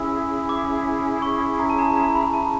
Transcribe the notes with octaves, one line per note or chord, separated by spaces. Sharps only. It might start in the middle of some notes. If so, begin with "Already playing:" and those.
Already playing: C#4 E4 G#4 E6
D6
C#6
A#5
A5
A#5
A#5
B5
A5